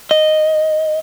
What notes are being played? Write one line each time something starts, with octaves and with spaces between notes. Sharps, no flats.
D#5